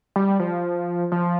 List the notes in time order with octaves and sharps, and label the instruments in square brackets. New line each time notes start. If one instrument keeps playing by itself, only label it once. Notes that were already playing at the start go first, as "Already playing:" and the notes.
[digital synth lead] G3
F3
F3